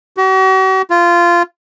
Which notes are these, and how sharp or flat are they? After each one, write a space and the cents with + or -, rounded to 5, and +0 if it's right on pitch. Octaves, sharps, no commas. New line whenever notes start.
F#4 +45
F4 -15